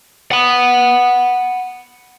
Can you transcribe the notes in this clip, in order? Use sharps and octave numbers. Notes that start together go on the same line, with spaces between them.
F#5 B5